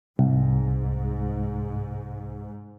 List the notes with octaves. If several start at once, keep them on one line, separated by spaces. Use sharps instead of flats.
C2 G#2